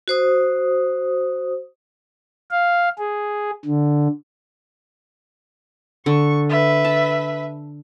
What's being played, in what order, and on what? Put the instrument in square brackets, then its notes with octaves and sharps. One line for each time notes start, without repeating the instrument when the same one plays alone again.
[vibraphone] F#4 C5 D#6
[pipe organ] F5
G#4
D3
[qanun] D3 [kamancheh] C#6
[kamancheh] B4 E5
[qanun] A5